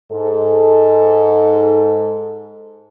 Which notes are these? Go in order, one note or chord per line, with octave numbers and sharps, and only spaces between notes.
G#2 A4